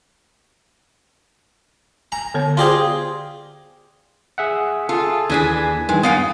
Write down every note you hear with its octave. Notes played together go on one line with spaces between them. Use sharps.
G#5 A#5
D3 B3 C#5
F4 G4 G#4 C5 D5 C6
G#4 E5 F#5
F4 G#4 A4
D#2 E3 D4 G#4 G#6 B6
G2 D#3 E3 G#3
B3 F5 G5 D#6